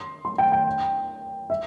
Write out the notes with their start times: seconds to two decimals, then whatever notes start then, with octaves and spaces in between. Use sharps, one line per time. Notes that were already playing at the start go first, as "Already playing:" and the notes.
Already playing: C6
0.25 C6
0.38 G5
0.52 G5
1.50 E5